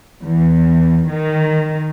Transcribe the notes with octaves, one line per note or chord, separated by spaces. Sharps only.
E2
D#3